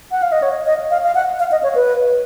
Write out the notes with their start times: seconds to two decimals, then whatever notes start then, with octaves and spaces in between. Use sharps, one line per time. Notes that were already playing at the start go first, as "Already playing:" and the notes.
0.12 F#5
0.22 F5
0.32 D#5
0.42 C#5
0.66 D#5
0.90 F5
1.04 F5
1.15 F#5
1.39 F5
1.52 D#5
1.63 C#5
1.75 B4